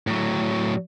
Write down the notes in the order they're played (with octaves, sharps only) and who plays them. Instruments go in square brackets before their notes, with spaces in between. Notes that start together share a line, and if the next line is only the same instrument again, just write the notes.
[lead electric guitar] A2 F#3